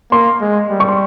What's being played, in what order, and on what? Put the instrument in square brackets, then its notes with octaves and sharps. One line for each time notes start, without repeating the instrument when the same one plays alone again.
[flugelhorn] A#3 [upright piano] C6
[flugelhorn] G#3
G3
[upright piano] C#6
C6